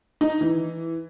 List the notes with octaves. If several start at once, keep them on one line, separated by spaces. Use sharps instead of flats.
D#4
E3